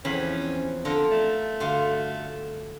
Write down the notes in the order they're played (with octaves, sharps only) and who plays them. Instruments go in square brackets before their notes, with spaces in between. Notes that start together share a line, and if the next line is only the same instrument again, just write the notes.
[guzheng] E2 B5 [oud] E3 F3 C4 [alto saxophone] C#4
[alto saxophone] D3 [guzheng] F4 A4 A#4
[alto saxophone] A3
[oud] G2 F#4 F5 [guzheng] D3 F4